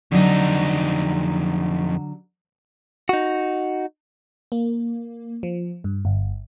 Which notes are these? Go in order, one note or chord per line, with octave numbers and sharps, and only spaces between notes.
F2 D3 F#3 D#4
D#4 F#4
A#3
F3
G2
G1